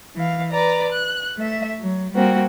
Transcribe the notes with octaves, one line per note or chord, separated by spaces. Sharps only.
E3 F5
B4 D5 A#5
F#6
A3 E5
F#3
G3 A#3 C4 F#4